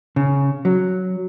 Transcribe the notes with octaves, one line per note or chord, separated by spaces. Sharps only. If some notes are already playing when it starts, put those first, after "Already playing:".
C#3
F#3